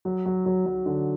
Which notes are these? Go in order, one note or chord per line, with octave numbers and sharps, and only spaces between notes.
F#3
F#3
F#3
F#3
D3